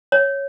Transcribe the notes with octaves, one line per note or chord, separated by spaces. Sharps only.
C#5